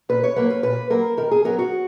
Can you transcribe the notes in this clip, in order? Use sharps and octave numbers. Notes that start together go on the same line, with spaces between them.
A#2 B4
C#5
F#3 A#3 B4
B4
A#2 B4
F#3 A#3 A#4
D#3 A#4
G#4
F#3 B3 A#4
F#4